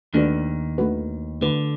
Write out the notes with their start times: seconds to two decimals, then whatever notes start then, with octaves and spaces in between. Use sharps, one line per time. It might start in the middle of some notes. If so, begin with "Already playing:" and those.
0.14 D#2 D#3 A3 D4 F#4 B4
0.78 A3 D4 F#4 B4
1.41 D3 A3 D4 F#4 B4